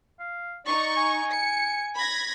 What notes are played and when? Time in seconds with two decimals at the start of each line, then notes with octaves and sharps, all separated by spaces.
0.20 F5
0.67 D#4 D5 C#6
0.97 G#5
1.31 C#7
1.97 B5 G#6 A#6